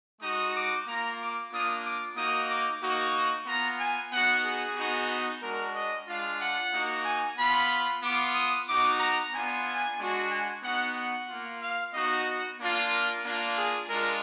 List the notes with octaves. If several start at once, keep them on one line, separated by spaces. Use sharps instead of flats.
G#3 D#4 F#4 D#6
D6
A#3 F4 A#5
D6
A#3 D4 F4 D#6
D6
A#3 D#4 F#4 D#6
D6
A#3 D#4 F#4
B3 F4 A#5
G#5
B3 D#4 F#4 F#5
G#4
B3 D#4 F#4
G#3 D4 F#4 A#4
D#5
G#3 D4 F4 F5
F#5
A#3 D#4 F#4
G#5
B3 F4 B5
B3 F4 D6
D#6
B3 D#4 F#4 D6
A#5
B3 D4 F4 G#5
G#3 D4 F#4
G#5
B3 D#4 F#4 F#5
F#5
A#3 F4
F5
B3 D#4 F#4 D#5
A#3 D4 F4
A#4
A#3 D4 F4
G#4
G#3 D4 F4 A#4